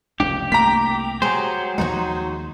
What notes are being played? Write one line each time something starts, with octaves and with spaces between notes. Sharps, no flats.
F1 C#2 D4 G4
C2 A3 A#3 A#5 B6
F#3 G#3 G4 G#4 C5
D#2 F3 G#3 D#4 F4 F#4